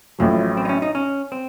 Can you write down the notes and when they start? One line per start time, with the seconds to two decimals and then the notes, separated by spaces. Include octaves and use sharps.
0.19 A1 A2 F3 F#3
0.57 C4
0.65 D#4
0.69 C#4
0.82 D#4
0.95 C#4
1.32 C4